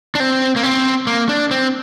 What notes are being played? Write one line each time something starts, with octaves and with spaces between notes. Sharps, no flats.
D4
C4
A#3
C4
A#3
D4
C4